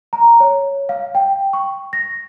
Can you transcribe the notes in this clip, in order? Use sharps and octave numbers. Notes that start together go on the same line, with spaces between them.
A#5
C#5
F5
G5
C#6
A#6